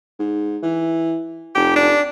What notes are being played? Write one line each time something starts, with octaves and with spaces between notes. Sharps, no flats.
G#2
E3
F1 G4
D4